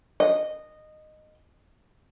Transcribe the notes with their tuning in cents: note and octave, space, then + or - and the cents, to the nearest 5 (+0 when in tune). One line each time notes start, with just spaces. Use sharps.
D#5 -15